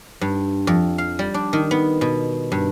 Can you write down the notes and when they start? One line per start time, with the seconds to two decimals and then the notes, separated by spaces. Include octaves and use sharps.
0.21 G2
0.67 F2
0.98 F5
1.19 G3
1.34 D4
1.53 D#3
1.71 B3
2.01 B2
2.52 G2